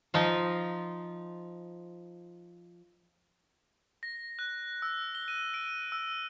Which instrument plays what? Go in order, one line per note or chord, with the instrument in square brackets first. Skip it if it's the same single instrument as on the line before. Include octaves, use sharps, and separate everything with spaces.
[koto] F3 D#4 F4
[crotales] A#6
F#6
E6
G7
D#7
D7
E6